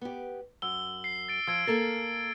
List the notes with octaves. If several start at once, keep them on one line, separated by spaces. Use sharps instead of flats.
B3 G4
F#2 E6 G7
C7
A6 D7
F3 E6 G#6 D7
A#3 A4 A#4 A6